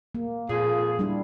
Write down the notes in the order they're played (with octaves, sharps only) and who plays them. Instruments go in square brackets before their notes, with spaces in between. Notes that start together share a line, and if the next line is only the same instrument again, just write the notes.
[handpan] A#3
[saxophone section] F2 F4 G#4 [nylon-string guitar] A#2
[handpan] G3 D4 E4